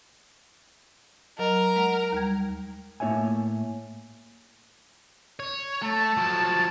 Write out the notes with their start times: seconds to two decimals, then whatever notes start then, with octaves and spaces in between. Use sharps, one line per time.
1.39 F#3 A#4 D#5
1.76 G#3 F#5
2.12 D#2 G3 G#6
3.00 A2 A#3 E4 C#5 E5 G#5
5.40 C#5
5.82 A3 A5
6.17 F3 F#3